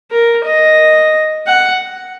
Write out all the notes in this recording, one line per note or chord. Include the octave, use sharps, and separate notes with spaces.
A#4
D#5
F#5